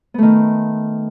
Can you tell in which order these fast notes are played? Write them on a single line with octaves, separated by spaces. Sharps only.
B3 A3 D#3